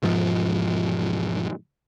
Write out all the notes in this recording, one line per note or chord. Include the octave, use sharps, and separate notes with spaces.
E1 G#2 F3